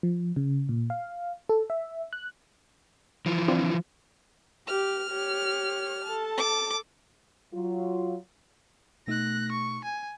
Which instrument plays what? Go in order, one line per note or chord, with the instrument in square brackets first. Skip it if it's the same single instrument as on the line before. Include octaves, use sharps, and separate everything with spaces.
[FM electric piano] F3
C#3
A#2
F5
A4
E5
F#6
[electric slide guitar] E3 F3
[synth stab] C4 D4 F4
[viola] G4 [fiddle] F6
[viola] G4 C#5
A4 A5
[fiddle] D6
[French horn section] F#3 F4
[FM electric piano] B2 A3 D#4 [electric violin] F#6 A#6
[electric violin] C#6
G#5